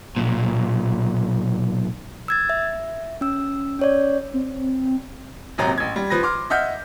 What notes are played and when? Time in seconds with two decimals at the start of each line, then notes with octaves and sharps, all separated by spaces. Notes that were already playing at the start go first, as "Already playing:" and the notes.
0.16 B1 A#2
2.28 E6 G#6 A6
2.49 E5
3.21 C#4 E6
3.79 C#4 C#5 D5
4.34 C4
5.58 D#1 G#1 C3 F#3 A#5
5.78 A1 G#6
5.96 G3
6.10 F3 B4 A#6
6.23 C6 D6 F6
6.50 D#5 E5 F#5 F6 G6